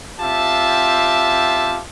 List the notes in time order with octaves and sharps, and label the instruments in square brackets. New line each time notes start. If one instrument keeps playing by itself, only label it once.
[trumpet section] C4 F4 G4 E5 A5